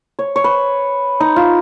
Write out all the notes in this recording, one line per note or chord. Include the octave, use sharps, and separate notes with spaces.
C#5
C#5
B4
D#4
F4